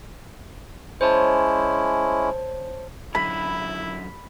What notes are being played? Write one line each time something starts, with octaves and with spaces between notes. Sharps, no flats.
G#3 C#4 E4 C5 C#5 A5
F#2 D3 E4 B5